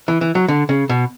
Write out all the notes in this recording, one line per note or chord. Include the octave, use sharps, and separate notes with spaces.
E3
E3
F#3
D3
C#3
B2